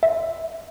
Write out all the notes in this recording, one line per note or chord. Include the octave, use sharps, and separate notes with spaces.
E5